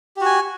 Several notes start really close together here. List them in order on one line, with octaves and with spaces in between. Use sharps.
G4 F#4 G#5